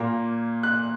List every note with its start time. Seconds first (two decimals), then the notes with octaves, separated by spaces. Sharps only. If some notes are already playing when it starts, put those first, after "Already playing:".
Already playing: A#2 A#3
0.63 F#6